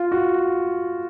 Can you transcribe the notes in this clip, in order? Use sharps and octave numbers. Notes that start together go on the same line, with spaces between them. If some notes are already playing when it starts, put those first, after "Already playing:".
Already playing: F4
F#4